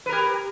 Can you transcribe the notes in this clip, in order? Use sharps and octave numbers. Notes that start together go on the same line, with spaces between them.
G4 A#4 B4